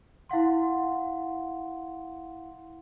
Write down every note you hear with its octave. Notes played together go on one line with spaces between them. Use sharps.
E4 F5 F#5 C6